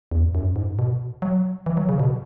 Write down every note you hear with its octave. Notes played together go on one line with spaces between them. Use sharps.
E2
G#2
F#2
G#2
B2
F#3
E3
F#3
C#3
B2